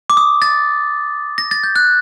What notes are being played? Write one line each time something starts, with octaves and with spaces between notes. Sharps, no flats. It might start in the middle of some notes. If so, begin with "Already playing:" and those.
D6
D#6
A6
A#6
A6
G6
F#6